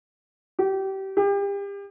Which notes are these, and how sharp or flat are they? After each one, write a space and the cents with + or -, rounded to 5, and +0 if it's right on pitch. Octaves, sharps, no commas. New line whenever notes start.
G4 -25
G4 +35